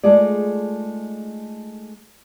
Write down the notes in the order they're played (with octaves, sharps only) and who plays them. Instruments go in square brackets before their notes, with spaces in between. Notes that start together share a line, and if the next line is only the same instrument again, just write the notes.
[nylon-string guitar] G#3 A3 D#4 F4 G#4 D5